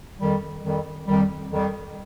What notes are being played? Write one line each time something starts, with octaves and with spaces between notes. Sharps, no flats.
F2 D#3 G3
F2 D#3 G3
F2 D#3 G3
F2 D#3 G3